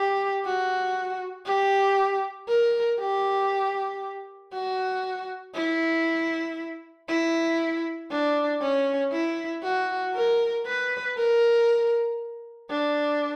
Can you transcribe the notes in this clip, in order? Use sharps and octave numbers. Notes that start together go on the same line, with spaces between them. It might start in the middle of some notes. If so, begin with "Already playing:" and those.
Already playing: G4
F#4
G4
A#4
G4
F#4
E4
E4
D4
C#4
E4
F#4
A#4
B4
A#4
D4